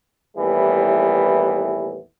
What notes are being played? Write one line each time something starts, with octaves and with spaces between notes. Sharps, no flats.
D#2 A2 E3 G3 B3